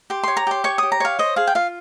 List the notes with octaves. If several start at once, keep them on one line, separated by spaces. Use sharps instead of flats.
G4 C6
C#5 C6
A#5
G4 C6
C#5 C#6
G4 D#6
A#5
C#5 F5
C5 D#5
G#4 F5
G5
F4 F5